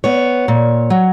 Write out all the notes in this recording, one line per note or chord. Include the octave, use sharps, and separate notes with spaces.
B3 C#5
A#2
F#3